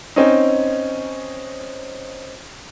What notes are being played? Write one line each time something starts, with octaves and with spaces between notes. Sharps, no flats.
C4 C#4 D#4